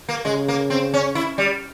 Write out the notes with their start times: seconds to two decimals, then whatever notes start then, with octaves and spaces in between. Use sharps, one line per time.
0.09 A#3
0.25 C#3 G#3
0.48 A#3
0.70 C4
0.94 C#4
1.15 E4
1.38 G3